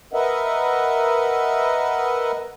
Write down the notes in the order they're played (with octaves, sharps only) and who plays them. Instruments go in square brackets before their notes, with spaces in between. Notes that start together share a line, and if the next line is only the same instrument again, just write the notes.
[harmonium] A#4 B4 D#5 E5 F#5